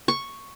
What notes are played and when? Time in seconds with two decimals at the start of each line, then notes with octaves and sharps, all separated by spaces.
0.08 C#6